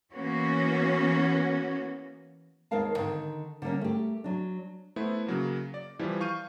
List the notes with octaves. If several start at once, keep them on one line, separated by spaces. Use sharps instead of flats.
E3 A#3 B3 C#4 F#4
D#2 G#3 B3 A#4 F5 A5
D3 D#3
D3 G3 A#3 C#4
A3 G4
F#3 D4
A3 B3 E4 C5
C#3 F#3 A#3
D5
E3 F3 G3 E4
F5 C#6 G6 D#7